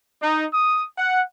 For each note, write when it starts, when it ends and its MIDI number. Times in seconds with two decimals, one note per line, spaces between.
0.21 0.45 63
0.53 0.84 87
0.96 1.22 78